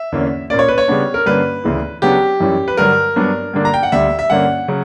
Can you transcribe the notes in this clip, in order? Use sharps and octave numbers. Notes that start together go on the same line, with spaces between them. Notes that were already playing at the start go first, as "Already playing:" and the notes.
Already playing: E5
E2 D3 A#3 C#4
A#2 A#3 C#4 D5
C#5
B4
C#5
C#3 G3 B3 D4
A#4
G2 D3 A#3 C#4 B4
D2 C#3 E3
C#3 F#3 B3 D4 G4
F#2 E3 G3 C#4
B4
G2 D3 F#3 A#4
G2 F#3 B3 D4
G2 D3 A#3 D4
A#5
G5
F#5
D2 D3 G3 E5
E5
G2 D3 A#3 C#4 F#5
C#3 F#3